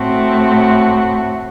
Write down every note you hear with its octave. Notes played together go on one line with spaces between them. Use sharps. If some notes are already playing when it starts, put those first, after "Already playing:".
Already playing: A2 A3 C4 F#4